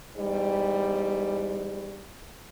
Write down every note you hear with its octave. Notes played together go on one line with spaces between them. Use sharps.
E2 G#2 G3